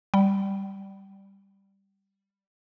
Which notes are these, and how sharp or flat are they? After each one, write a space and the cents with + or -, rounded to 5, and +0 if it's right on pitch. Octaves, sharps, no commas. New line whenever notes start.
G3 +0 G5 -35